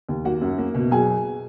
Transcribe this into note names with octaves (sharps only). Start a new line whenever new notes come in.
D#2
A#3 F#4 F#5
F#2
A#3
B2
F#3 G#4 G#5